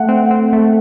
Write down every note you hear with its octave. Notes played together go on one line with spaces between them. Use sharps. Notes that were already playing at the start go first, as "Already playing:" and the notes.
Already playing: A3 F#5
C4
C4
A3